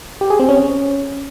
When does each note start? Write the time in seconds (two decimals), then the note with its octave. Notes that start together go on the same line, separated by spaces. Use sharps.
0.21 G4
0.30 G#4
0.40 C4
0.49 C#4